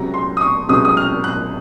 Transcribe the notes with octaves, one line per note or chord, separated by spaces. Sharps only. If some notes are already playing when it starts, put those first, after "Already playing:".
Already playing: C#2 C3 F#3 A#5
C6
D#6
C#6
C#2 C3 F#3 D#6
D#6
F6
F#6